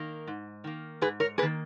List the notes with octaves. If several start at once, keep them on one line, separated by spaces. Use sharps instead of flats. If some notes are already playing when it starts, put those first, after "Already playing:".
Already playing: D#3 A#3
G#2
D#3 A#3
G#2 G#4 B4
A#4 C#5
D#3 A#3 G#4 B4